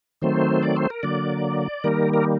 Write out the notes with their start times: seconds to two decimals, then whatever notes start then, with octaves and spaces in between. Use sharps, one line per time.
0.22 D#3 F#3 A3 C4 C5
0.63 D5
0.76 C5
0.90 A#4
1.03 D3 F#3 A#3 D5
1.84 D#3 G3 A#3 A#4
2.13 A#4